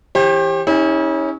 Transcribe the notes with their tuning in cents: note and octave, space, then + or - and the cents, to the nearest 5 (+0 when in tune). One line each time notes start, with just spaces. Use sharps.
E3 +0 G4 +15 C5 +45
C#4 +0 E4 -45 G4 +45